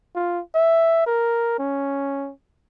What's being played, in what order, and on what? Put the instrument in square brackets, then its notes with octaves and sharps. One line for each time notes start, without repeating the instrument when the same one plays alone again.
[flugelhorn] F4
E5
A#4
C#4